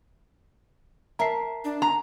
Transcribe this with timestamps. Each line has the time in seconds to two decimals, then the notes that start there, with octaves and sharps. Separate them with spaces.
1.19 A#4 E5 A5 A#5 C7
1.64 D4
1.82 A#5